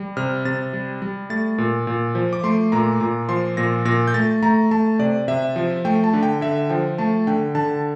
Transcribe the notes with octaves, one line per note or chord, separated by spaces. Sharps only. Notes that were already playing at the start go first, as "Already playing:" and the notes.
Already playing: G3
C3 F6
C3 A6
G3
G3
A3 A6
A#2
A#2
F3
D6
A3 C6
A#2 A#5
A#2 A#5
F3 C6
A#2 A#6
A#2 A#6
G6
A3 A6
A3 A#5
A3 A5
C3 D5
C3 E5
F3
A3 G5
A5
D3
G5
D3 E5
F3 G5
A3 A5
D3 G5
D3 A5